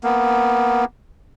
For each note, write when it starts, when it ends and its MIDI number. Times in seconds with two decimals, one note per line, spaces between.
0.04 0.85 58
0.04 0.85 59